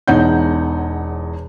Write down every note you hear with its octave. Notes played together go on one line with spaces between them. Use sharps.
E1 E2 D#4 C#5 F#5 G6